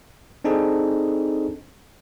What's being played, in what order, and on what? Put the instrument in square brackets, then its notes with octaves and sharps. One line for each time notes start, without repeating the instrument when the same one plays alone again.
[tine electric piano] C4 D4 D#4 G#4 A4